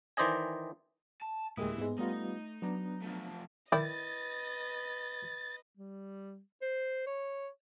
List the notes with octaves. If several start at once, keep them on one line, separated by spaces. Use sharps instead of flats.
D#3 E3 C5 D5 D#5 G#5
A5
D2 A2 E3 G#3 A#3 E4 G4 D#6
G#2 G#3 B3
G3 A3 B3 D#4 F4
F#3 B3 D4 A#5
F3 A3
D#3 E4 B4 D5 D#5 G5 A6
G3
C5
C#5